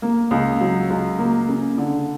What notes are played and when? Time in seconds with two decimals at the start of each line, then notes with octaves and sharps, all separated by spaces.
0.02 A#3
0.31 C#2
0.61 F#3
0.90 C#2
1.19 A#3
1.49 C#3
1.78 D3